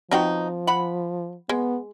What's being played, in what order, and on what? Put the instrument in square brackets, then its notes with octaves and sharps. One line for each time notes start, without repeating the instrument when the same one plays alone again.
[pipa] B2 D#4 [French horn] F3 [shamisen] C4 F#4 G5
[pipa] F#5 B5
[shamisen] G#3 [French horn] B3